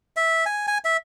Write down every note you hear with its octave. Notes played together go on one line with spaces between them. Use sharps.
E5
G#5
G#5
E5